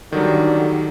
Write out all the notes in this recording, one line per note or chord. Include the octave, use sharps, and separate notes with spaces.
D3 D#3 F#3 G3